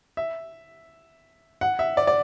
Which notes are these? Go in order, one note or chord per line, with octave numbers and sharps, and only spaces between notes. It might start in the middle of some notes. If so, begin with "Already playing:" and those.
E5
F#5
E5
D5
D5